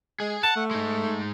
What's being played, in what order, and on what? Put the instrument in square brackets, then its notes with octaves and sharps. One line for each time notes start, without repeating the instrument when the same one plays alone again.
[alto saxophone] G#3 [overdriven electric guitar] G#4
[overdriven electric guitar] F#5 [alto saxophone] A5
[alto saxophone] A3
[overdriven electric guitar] G#3 D#4